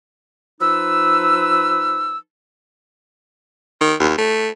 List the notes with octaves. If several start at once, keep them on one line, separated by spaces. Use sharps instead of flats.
F3 D#4 B4 E6
D#3
D#2
A3